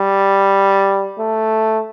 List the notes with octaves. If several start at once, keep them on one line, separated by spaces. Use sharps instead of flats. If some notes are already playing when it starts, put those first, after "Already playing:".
Already playing: G3
A3